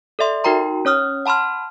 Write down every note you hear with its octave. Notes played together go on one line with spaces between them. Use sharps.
A4 D5 E5 C6
D#4 F#4 A#4 G5 A#5 C6
C#4 C#5 D#6 F6
F#5 A5 B5 C6 F6